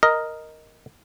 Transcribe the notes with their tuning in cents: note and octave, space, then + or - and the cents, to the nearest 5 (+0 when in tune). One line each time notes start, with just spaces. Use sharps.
A#4 +0 D#5 +0